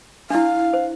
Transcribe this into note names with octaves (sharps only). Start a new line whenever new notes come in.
D4 E4 F5
C5